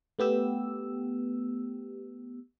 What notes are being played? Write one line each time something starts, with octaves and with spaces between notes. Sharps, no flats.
A3 B3 G4 E6